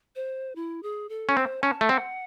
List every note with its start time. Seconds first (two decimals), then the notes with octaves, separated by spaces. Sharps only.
0.16 C5
0.55 E4
0.83 G#4
1.09 A4
1.29 C#4
1.36 C4 C5
1.63 C#4 A5
1.81 A3
1.89 C4 F#5